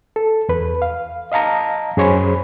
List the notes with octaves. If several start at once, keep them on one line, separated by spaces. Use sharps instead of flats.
A4
E2 B4
F5
D#5 F5 A5 A#5
F#2 G#4 C5 C#5 G#5 B5